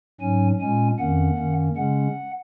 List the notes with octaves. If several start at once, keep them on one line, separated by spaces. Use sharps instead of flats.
G#2 F#3 C#4 G#5
A#2 G#3 C#4 G#5
F2 D#3 A#3 C#4 F#5
F#2 D#3 A#3 C#4
C#3 G#3 C#4 F#5